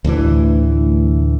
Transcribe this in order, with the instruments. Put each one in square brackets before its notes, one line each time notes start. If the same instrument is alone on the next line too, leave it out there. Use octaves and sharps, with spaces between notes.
[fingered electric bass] D2 A2 D3 E3